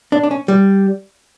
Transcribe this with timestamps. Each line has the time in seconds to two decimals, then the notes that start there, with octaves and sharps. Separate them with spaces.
0.12 D4
0.23 D4
0.31 C#4
0.48 G3